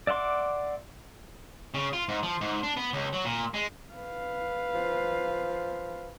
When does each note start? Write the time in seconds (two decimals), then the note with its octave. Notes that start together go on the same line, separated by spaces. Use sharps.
0.07 D5 E5 F#5 C6 D6
1.74 C#3
1.93 F4
2.08 G#2
2.23 F3
2.41 G#2
2.63 D4
2.77 B3
2.93 C#2
3.13 F#3
3.25 A#2
3.54 G#3
3.93 B4 F5
4.75 F3